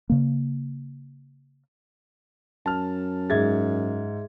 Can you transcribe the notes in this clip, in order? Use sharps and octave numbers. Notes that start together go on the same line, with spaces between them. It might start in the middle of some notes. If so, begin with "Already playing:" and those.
C#3 A#3
F#2 A5 F6
G#2 G#4 E5 G#6 A6